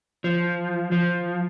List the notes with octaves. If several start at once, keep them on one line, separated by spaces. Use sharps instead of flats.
F3
F3